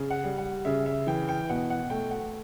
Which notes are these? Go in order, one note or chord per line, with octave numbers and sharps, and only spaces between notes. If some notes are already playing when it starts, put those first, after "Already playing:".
Already playing: C#3
F#5
G3
F#5
C#3 E5
E5
E3 G5
G5
B2 F#5
F#5
A3 G5
F#5